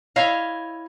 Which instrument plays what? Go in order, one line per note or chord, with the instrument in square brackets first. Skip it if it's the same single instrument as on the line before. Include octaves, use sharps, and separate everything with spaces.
[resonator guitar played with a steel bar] E4 C#5 D#5 F5